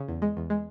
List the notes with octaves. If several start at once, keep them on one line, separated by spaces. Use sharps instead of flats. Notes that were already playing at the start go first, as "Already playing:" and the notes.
Already playing: C#3
E2
G#3
E2
G#3